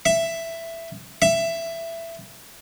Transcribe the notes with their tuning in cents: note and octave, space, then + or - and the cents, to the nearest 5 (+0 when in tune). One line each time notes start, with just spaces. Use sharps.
E5 +10
E5 +15